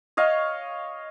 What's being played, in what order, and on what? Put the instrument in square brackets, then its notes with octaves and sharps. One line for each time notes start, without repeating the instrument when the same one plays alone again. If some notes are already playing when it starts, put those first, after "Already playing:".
[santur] C#5 D#5 F5 C#6